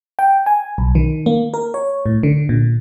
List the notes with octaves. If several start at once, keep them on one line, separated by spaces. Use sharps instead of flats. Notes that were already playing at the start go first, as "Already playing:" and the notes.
G5
G#5
B1
D#3
A#3
A#4
C#5
A2
D3
A#2